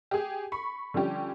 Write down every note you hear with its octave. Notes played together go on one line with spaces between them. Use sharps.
G4 G#4
B5 C#6
D3 F3 G3 C#4 G4